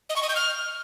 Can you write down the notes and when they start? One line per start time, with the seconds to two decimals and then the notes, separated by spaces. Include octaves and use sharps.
0.10 D#5
0.16 C#6
0.23 D#5
0.29 G6
0.36 F6